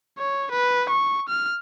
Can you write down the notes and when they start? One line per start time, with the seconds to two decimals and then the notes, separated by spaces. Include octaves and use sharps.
0.19 C#5
0.52 B4
0.90 C#6
1.29 F6